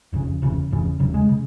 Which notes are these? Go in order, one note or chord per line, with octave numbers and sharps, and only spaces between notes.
F1 F2 C#3
F#1 E2 C#3
F#1 E2 C#3
F1 E2 C#3 F#3
G#3
C#3